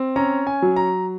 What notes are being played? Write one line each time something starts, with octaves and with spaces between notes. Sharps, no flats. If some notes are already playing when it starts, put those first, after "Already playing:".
Already playing: C4
C#4 A#5
G#5
F#3
A#5